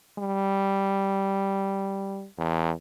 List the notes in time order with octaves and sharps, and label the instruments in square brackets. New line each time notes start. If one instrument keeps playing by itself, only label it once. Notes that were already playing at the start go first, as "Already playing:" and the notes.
[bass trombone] G3
E2